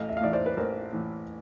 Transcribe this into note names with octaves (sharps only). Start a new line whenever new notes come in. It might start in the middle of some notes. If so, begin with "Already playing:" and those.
Already playing: A1 D#5 F5
E5
F5
A2 E3 D5 E5
C5 D5
B4
A1 A#4 C5
A2 E3